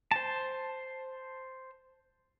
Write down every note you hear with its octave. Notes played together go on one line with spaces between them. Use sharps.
C5 A5